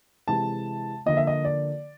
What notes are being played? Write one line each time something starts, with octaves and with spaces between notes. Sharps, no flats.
C3 E3 G#3 A5
D3 F3 A#3 D#5
E5
D#5
D5